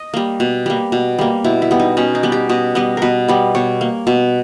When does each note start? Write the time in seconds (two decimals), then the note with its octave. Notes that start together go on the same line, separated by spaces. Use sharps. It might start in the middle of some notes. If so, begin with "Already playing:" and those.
Already playing: D#5
0.14 G3 A#3
0.40 B2
0.66 G3 A#3
0.92 B2
1.19 G3 A#3
1.44 B2 E4
1.62 E4
1.71 G3 B3
1.80 D#4
1.97 B2 C#4
2.15 D#4
2.23 G3 B3
2.32 G4
2.49 B2 D#5
2.75 G3 B3 D#5
2.97 B2 A#4 B4
3.28 G3 B3
3.55 B2 C#5
3.81 A#3
4.07 B2